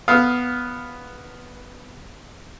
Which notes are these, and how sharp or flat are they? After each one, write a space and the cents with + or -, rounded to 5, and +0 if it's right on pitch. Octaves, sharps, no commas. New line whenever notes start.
B3 +0 F5 +5 D#6 +25